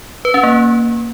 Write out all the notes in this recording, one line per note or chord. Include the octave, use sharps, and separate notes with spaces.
B4
C#4
A#3